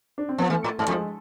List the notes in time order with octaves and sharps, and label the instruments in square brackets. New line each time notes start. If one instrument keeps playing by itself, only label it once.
[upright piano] D4
C4
[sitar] F3 [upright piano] B3
[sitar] E3 [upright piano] A3
[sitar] A2
[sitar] G#2 [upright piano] A3
[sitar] F2 [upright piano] F3
[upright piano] G#3